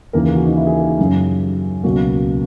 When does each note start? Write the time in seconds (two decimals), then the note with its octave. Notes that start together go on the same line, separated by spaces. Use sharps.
0.13 D#2 C#3 E3 A#3 A#4
0.24 G#4
0.35 F#4
0.46 D#4
0.56 E4
0.66 G#4
0.78 A#4
0.89 G#4
0.99 F#2 C#3 F#3
1.84 C#2 B2 F#3 A#3 F#4